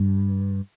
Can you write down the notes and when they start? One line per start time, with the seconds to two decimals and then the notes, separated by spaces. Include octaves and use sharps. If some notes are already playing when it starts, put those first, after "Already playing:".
Already playing: G2